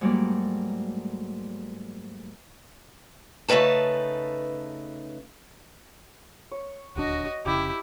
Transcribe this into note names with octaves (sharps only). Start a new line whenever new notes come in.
G#2 F#3 G3 A3 A#3 D5
C#3 A3 D#4 B4 A5
C#5
D#1 D2 D4 F#4 D#5
F1 C#3 E4 G4